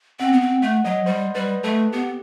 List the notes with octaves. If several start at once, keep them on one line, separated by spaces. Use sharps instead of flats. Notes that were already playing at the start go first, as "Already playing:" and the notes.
C4 F#5
B3
C4
A3 F#5
F#3 D#5
G3 C5
G3 B4
A3 A4
B3 G4